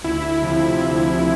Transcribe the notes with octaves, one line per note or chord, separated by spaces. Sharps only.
D2 E4
C3 F3
D2
C3